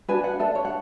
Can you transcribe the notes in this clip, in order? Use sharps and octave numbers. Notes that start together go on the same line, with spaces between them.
D4 F#4 B4 G#5
F#5
D4 A4 E5
C#5
F#5